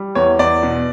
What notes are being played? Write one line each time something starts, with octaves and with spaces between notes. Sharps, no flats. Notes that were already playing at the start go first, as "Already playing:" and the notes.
Already playing: G3
E2 C#5
E2 D5
B2